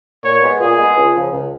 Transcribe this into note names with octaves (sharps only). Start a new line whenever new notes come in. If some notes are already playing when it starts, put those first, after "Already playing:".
A#2 C#5
G#3 B3
A#2 G#4
G#3 B3
C#2
C#3 F3
C#2